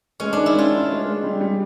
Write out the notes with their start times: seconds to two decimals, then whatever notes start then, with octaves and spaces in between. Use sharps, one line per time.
0.20 G#3 C#4
0.33 D#3 D4
0.46 E4
0.55 C#4 F4
0.72 C#4
0.89 G#3
1.06 G#3
1.23 G3
1.41 G3